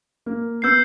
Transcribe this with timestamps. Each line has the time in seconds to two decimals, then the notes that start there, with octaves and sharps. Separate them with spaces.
0.26 A#3
0.62 B3 E6 G6 C7